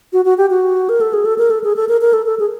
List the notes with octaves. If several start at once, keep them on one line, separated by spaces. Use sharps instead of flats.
F#4
F#4
G4
F#4
A#4
A4
G#4
A4
A#4
A4
G#4
A4
A#4
A#4
A4
A4
G#4